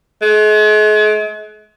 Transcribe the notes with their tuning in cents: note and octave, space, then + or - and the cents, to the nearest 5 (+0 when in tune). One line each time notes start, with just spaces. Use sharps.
G#3 +40